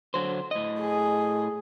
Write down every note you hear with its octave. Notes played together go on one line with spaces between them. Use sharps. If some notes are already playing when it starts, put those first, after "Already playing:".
D3 F#3 C5
A2 D#5
G#4